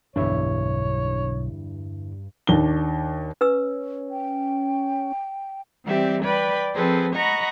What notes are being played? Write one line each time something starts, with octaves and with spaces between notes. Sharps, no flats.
B1 E2 G2 D3 D4 E4 C#5
D#2 D4 G7
C#4 B4 E6
G5
E3 G3 C4 G4 D5 E5
B4 D5 G5 B5
F3 C4 G#4 A4 B4 C5
D#5 F#5 A#5 B5 C#6 A#6